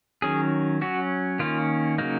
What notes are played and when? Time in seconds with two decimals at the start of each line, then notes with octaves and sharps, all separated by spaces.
0.22 D#3 F#3 C#4 G#4
0.81 F#3 C#4 F#4
1.39 D#3 A#3 C#4 F4
1.98 C#3 F#3 A#3 D#4